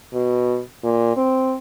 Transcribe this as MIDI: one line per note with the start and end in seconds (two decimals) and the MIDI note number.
0.14 0.60 47
0.84 1.12 46
1.17 1.56 60